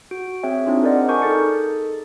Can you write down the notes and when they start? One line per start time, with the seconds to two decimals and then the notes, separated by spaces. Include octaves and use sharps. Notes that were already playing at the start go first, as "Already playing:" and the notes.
0.11 F#4 D7
0.43 C4 G#4 C#5 E5 G5
0.66 C4 D4 D#4 F4 G#4
0.84 A#4 C5 D5 D#5 F#5
1.09 A#4 G#5 A5 C#6 D6 G6
1.22 D#4 G#4 A4 A6 C#7